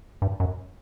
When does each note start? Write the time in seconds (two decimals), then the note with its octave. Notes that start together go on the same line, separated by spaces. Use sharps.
0.22 G2
0.40 F#2